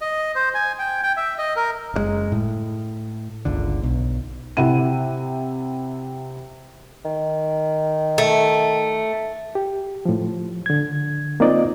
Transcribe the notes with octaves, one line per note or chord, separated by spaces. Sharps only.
D#5
C5
G#5
G5
G5
E5
D#5
A#4
F#1 C#3 G#3
A2
G1 C#2 D3
B1
C3 E4 F#5 D#7
D#3
A3
G4
A2 F3
D3 G#6
A#3 C4 D#4 F4 D5 D#5